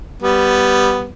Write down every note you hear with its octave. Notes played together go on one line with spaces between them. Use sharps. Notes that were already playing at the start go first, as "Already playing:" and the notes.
G3 B3